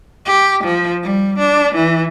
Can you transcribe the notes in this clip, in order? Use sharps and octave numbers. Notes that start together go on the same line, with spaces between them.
G4
F3
G3
D4
E3